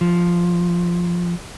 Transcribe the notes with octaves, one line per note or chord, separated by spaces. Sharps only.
F3